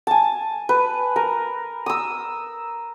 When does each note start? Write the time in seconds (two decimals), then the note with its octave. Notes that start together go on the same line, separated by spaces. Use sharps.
0.07 G#5 A5
0.69 B4
1.16 A#4
1.86 D#6 E6